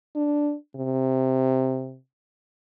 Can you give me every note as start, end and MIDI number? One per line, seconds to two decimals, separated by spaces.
0.16 0.55 62
0.76 1.97 48